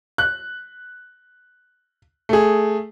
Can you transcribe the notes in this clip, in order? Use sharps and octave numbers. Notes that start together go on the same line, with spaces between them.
F#6
A3 G#4